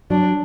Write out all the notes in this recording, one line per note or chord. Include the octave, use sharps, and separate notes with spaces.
F#3 D4